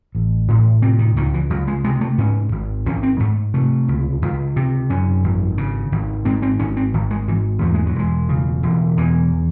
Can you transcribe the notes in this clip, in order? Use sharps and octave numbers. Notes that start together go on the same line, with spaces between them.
A1
A2
C3 C4
D#3
C#2 D#3
E3
C#2 F#3
G#3
C3 G#3
A3
G#2 C#4
G#1
G#1 C#4
C4
G#2 A3
C3 A3
C#2
C#2
C3
F#2 C#4
G#1
C#3
G#1
G#2 C4
C4
G#1 C#4
C4
G#1
G#3
G#2 E3
E2 A3
G#3
F#3
E1 G#3
C#3
E1
E2 E3